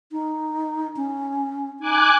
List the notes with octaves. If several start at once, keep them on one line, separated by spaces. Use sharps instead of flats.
D#4
C#4
D#4 G#5 D6 F#6